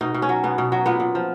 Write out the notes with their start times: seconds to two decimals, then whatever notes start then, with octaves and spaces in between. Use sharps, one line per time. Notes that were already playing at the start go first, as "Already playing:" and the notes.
0.01 B2 D#4
0.14 B2
0.22 C#4
0.29 F#3
0.44 B2 B3
0.58 B2
0.72 F#3
0.86 A#2 B3
1.00 A#2
1.15 F3